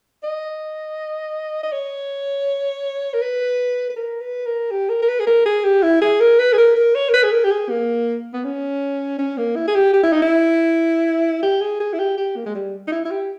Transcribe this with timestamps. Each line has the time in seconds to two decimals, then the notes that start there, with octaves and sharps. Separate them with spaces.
0.23 D#5
1.63 D#5
1.72 C#5
3.14 A#4
3.21 B4
3.89 B4
3.96 A#4
4.21 B4
4.46 A#4
4.71 G4
4.89 A#4
5.02 A#4
5.08 B4
5.20 G#4
5.27 A#4
5.46 G#4
5.64 G4
5.83 E4
6.01 G#4
6.20 A#4
6.39 B4
6.53 G#4
6.58 A#4
6.76 A#4
6.95 C#5
7.09 A#4
7.13 B4
7.23 G#4
7.32 A#4
7.44 G4
7.51 G#4
7.69 A#3
8.33 B3
8.44 C#4
9.19 C#4
9.38 A#3
9.56 E4
9.68 G#4
9.75 G4
9.93 G4
10.03 E4
10.12 D#4
10.22 E4
11.43 G4
11.61 G#4
11.80 G#4
11.93 E4
11.99 G4
12.17 G4
12.36 A#3
12.46 G#3
12.55 G3
12.87 D#4
12.92 E4
13.05 E4
13.11 G4